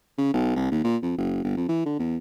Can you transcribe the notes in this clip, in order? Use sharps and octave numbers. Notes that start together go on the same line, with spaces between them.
C#3
B1
C2
D#2
A#2
F2
F#1
G1
F2
E3
D3
E2